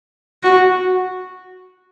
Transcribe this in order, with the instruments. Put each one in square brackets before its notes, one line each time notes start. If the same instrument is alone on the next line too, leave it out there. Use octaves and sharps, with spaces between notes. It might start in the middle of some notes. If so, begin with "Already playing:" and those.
[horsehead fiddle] F#4